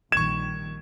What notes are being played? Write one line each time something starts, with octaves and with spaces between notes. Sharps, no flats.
A#1 D#3 G3 C#6 G#6 E7